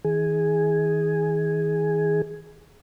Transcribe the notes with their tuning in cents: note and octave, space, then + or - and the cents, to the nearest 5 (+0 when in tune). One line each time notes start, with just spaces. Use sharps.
D#3 +45 G#4 +0